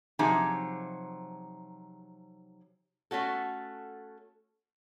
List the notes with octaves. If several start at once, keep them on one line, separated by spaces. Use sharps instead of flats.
C3 F3 F#3 D#4 G4 G#4
A3 C#4 F#4 A4